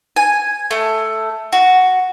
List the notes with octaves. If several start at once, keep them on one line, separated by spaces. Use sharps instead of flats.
G#5
A3
F#4